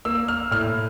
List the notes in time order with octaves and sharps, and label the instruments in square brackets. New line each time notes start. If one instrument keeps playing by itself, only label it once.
[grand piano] A#3 E6
F6
A2 F6